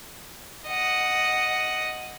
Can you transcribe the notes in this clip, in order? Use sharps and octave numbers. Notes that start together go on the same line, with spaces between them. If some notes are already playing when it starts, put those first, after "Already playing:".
D#5 F#5